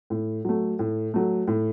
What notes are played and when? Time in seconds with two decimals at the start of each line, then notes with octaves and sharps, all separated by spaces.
0.10 A2
0.45 F#3 A3
0.79 A2
1.14 F#3 A3
1.48 A2